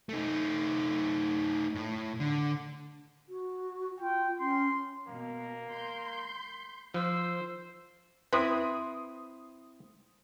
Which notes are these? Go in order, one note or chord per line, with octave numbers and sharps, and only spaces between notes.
A3 D#4
A2
D3
F#4
F4 G5
C#4 C6
B2 A#3
C6 G6
F3 C5 E6
C4 E4 B4 C6 D#6